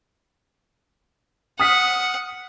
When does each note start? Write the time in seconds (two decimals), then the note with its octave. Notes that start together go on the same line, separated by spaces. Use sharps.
1.60 F#5 D#6 F6 B6